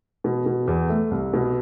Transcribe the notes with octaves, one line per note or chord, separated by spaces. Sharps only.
B2
B2
E2
A3
C2
B2